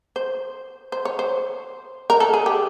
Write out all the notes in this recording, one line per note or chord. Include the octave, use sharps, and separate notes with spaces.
C5
C5
C#5
C5
A#4
A4
G#4
G4